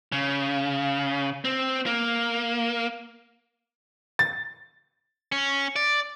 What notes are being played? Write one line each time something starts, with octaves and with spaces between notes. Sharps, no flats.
C#3
C4
A#3
A6
C#4
D5